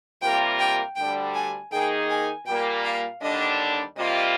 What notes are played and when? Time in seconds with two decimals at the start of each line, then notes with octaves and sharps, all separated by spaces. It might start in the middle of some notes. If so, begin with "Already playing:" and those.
0.21 C3 G3 A#3 F4 A#4 G5
0.59 G5
0.96 D2 D3 G3 D4 G5
1.34 G#5
1.71 D#3 A#3 D#4 G#4 G5
2.09 G#5
2.46 A#2 G3 A#3 G5
2.84 F5
3.21 D#2 D3 G3 D4 D#5
3.97 C3 G3 A#3 F4 D#5